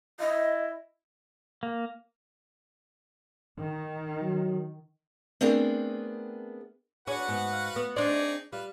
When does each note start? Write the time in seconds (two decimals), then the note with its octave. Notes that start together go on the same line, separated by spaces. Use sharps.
0.20 E4 D#5
1.63 A#3
3.59 D#3
4.21 F#3
5.41 A3 B3 C4 D4 G#4 A#4
7.07 D4 F#4 G#4 B4 C#5 F#5
7.28 G#2 B3
7.53 F5
7.76 B3
7.96 C4 D4 D#4 G#4 D5
8.52 G3 B4 F5